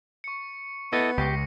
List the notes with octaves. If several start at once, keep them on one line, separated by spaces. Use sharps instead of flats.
C#6 C#7
B3 E4 A4 D#5 C#7
C#2 G4 C#6 A#6 C7